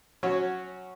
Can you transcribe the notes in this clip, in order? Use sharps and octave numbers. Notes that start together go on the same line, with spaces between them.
F#3 C#4 F#4 C#5